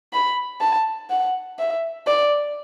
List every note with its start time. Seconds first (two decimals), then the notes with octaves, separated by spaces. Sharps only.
0.13 B5
0.61 A5
1.10 F#5
1.59 E5
2.07 D5